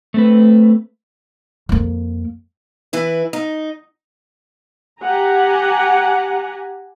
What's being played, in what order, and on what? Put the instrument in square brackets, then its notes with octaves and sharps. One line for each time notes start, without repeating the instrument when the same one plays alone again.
[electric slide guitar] A3 C4 B4
[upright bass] F2 A#3
[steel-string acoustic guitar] E3 E4 B4
D#4
[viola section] G4 F#5 G#5 A#5